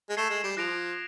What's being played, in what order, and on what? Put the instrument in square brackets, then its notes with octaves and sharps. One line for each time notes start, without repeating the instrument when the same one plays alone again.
[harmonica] G#3
[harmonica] A3 [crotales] G#6 C7 E7 G7
[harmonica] G#3
G3
[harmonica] F3 [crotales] F#6 A#6 D7 F7